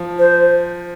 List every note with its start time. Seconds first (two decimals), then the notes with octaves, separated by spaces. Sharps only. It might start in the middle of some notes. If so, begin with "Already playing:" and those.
Already playing: F3
0.19 C5